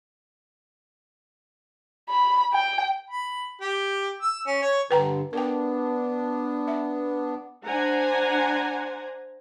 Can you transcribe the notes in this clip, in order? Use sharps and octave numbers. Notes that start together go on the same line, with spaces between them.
B5
G5
B5
G4
E6
C#4
C#5
G2 D3 B4 G5 A#5
B3 D4 A#4 G5
E5
D4 C5 F#5 G#5 A#5